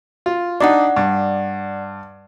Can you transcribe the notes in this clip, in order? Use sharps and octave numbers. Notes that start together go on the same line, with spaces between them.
F4
D4 D#4 D5 F#5
G2